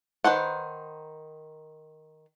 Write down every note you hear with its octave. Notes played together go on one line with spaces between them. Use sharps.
D#3 B4 C5 F#5